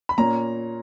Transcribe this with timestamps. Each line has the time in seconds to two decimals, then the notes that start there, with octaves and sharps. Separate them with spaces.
0.09 B5
0.18 A#2 A#3 C#4 A#5